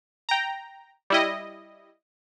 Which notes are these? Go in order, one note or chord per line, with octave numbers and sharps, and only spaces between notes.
G5 A#5
G3 E4 D#5